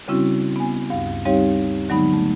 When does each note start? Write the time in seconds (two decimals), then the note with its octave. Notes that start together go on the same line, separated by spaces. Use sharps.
0.08 C#3 G3 C4 C#4 E4 F#4
0.56 B3 G#5
0.90 D2 G2 F5
1.25 G3 C4 D#4 G4 C#5 F5
1.89 D3 F#3 G#3 B3 D#4 B5
2.13 A3